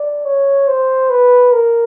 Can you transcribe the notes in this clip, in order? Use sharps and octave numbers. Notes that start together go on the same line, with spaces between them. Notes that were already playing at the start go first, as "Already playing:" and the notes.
Already playing: D5
C#5
C5
B4
A#4